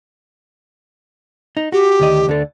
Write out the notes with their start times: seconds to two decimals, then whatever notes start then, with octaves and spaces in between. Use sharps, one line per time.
1.57 D#4
1.72 F#4 G4
2.00 D2 D#3 D#5
2.27 D2 D3 A4